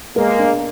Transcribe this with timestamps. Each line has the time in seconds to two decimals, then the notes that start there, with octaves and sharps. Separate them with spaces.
0.16 G#3 A#3 A#4
0.39 D4